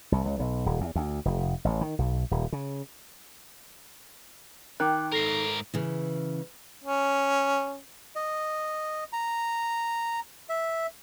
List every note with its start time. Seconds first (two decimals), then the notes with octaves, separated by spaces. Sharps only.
0.12 C2
0.26 C#2
0.39 B1
0.66 D#1
0.81 E2
0.95 D2
1.25 F1
1.65 A1
1.81 D#3
1.99 B1
2.31 D#1
2.52 C#3
4.80 D#3 G5 D6 F#6
5.12 G#2 A4 A#4 A#6 C7
5.74 C#3 E3
6.84 C#4
8.16 D#5
9.13 A#5
10.49 E5